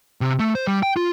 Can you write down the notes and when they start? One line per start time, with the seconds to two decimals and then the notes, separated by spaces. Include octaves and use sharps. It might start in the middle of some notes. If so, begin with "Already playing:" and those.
0.21 C3
0.39 A3
0.55 C5
0.67 G3
0.83 G5
0.96 F4